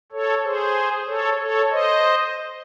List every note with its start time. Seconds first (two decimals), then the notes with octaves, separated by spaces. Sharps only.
0.12 A4 C#5
0.44 G#4 C5
1.07 A4 C#5
1.39 A4 C#5
1.71 C5 D#5